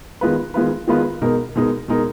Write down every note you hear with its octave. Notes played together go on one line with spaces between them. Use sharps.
D#3 G#3 B3 F4 B4
D#3 G#3 B3 F4 B4
D#3 G#3 B3 F4 B4
B2 G#3 D#4 A#4
B2 G#3 D#4 A#4
B2 G#3 D#4 A#4